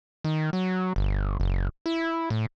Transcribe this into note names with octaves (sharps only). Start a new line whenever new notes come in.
D#3
F#3
G1
F#1
E4
A2